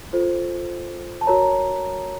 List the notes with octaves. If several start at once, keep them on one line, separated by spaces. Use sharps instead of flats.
F4 A4 C5
A5
F#4 A#4 C#5 A#5